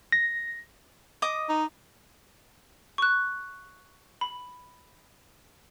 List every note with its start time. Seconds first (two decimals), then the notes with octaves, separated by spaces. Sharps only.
0.12 A#6
1.22 D#5 D6 D#6
1.49 D#4
2.98 C#6 F#6
4.21 B5